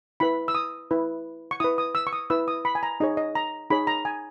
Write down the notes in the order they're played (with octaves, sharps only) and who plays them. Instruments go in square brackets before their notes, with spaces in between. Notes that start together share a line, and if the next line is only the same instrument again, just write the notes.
[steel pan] E4 B4 B5
E6
D#6
E4 B4
C#6
E4 B4 D#6
D#6
E6
C#6
D#6
E4 B4 E6
D#6
B5
G#5
A#5
D#4 G#4 C#5 D#5
D#5
A#5
D#4 G#4 C#5 B5
A#5
G#5